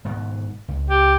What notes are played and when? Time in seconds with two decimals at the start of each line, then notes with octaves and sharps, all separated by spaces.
0.05 G#2 B2 D#3
0.68 C#2
0.90 G4